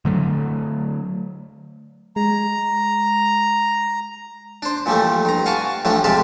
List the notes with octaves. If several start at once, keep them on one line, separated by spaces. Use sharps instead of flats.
D3 F#3 A3
G#3 A#5
D4 C5
A#2 E3 F3 G3 A3
G2 A#5
F5 F#5 G#5 A5 C#6 D6
A2 E3 F3 G3 D4
C3 G#3 G4 D5 F5 A5